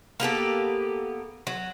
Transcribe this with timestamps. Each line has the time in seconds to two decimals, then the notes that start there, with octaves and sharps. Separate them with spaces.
0.20 A#3 B3 G4 A4
1.47 F#3